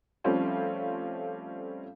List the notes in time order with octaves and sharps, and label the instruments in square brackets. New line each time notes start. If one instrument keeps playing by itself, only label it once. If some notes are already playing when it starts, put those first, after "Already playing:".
[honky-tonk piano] F3 G3 A3 C4 C#4 F4